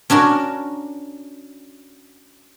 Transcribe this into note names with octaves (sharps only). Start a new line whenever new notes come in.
C#4 D4 F#4 A#4